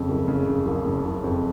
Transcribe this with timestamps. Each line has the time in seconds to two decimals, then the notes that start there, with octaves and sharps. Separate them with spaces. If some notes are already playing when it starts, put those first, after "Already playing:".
Already playing: F2 C#3
0.09 F#1
0.28 C#3
0.47 C#3
0.66 F#1
0.86 C#3
1.05 F#1
1.24 F2